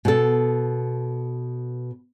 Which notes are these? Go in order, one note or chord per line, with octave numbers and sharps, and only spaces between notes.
B2 A4